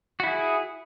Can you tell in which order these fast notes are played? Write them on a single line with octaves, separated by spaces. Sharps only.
F#4 E4 G#4